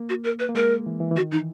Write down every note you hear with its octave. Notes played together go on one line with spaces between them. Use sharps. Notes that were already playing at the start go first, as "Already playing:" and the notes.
Already playing: A#3
F#4
A#4
B4
A#3
G#3 A#4
E3
E3
E3
D#3 F#4
E3 D#4